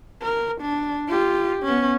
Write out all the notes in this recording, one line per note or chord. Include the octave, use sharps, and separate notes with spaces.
A#4
D4
F4 G4
B3 C#4